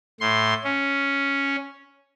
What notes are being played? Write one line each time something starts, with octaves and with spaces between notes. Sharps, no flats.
A2 C6
C#4